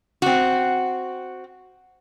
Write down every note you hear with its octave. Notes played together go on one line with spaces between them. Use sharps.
C4 F#4